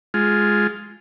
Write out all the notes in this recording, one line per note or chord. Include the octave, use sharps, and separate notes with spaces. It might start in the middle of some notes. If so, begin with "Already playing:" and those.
G#3 F4